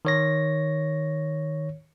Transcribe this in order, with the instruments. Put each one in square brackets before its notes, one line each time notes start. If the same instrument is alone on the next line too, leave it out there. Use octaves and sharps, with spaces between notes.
[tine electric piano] D#3 C#5 A#6